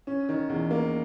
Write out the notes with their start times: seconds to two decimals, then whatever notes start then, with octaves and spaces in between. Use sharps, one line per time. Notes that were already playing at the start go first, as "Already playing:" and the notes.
0.07 C#4
0.29 D#3
0.49 E2
0.71 A#3